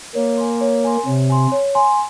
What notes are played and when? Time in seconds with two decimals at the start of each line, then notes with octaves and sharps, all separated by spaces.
0.15 A#3 C#5
0.37 G#5 C6
0.61 C#5
0.84 G#5 C6
1.06 C3 C#5
1.30 G#5 C6
1.52 C#5
1.75 G#5 C6